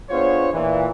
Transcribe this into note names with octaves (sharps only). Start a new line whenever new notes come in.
B3 D4 F4 G#4 C5 C#5
A#2 E3